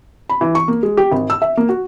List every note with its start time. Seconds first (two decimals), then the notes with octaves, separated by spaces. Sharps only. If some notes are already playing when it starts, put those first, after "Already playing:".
0.30 B5
0.41 E3
0.55 C#6
0.68 A#3
0.83 G#3
0.97 G4
1.11 G#1
1.30 E6
1.42 E5
1.57 A#3
1.69 F#4